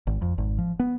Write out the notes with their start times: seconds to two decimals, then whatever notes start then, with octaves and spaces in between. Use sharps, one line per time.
0.07 G#1
0.22 F2
0.38 G#1
0.58 F3
0.79 B3